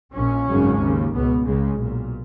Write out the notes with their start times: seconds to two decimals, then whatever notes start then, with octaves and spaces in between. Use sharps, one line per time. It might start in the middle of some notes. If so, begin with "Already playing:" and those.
0.14 A#1 A#2 C#4
0.48 G#1 F#2 C#3
0.80 D#2 C#3
1.13 C#2 B2 B3
1.45 C#2 C#3 G#3
1.79 B1 A#2